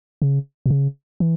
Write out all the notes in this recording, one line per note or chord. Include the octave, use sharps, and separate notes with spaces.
C#3
B2
C#3
E3